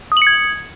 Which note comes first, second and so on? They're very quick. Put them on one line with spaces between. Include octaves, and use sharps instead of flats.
D#6 F#7 C#7 G#6